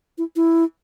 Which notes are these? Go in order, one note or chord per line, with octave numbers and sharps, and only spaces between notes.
E4
E4